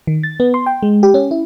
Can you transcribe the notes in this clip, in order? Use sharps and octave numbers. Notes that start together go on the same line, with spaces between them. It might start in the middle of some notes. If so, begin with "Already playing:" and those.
D#3
A6
B3
C6
G5
G#3
G4
C#4
E4